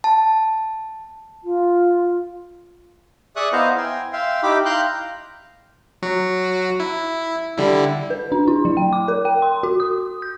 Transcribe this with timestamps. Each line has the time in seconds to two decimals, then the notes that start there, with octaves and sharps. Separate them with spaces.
0.04 A5
1.44 F4
3.36 G#4 D5 E5 C#6 D#6 F#6
3.53 B3 E4 C5 D#5 F5 A#5
3.77 G5 G#5 C6
4.13 E5 F5 G5 C6
4.43 D#4 E4 G4 G5 B5 D6
4.65 F5 G5 A#5 C6 F#6 G6
6.02 F#3 F#4
6.80 E4
7.58 D3 G3 E4
8.10 B4
8.32 D4
8.47 E4
8.65 F#3
8.77 G5
8.93 D6
9.08 A#4
9.25 G5
9.42 C6
9.63 F#4
9.80 D#6
10.22 G6